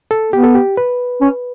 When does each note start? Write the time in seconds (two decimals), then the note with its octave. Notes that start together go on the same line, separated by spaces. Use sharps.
0.11 A4
0.32 B3 G4
0.44 A4
0.55 G4
0.77 B4
1.21 C#4